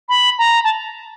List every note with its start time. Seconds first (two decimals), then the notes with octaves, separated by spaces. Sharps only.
0.08 B5
0.38 A#5
0.63 A5